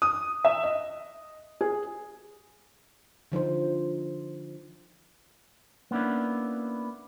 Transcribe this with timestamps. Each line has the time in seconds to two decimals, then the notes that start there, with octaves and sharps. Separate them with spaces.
0.02 D#6
0.45 E5
0.63 D#5
1.61 G#4
3.32 D3 F3 D#4 C5
5.91 A#3 B3 C#4 D4 E4